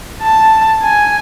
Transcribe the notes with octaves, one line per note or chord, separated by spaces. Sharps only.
A5
G#5